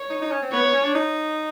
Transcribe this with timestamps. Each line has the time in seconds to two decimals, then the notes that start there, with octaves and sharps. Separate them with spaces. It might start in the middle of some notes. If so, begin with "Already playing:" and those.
Already playing: C#5
0.10 D#4
0.22 D#4
0.31 C#4
0.42 C4
0.52 B3 C#5
0.63 B3
0.73 C#4
0.83 D4
0.95 D#4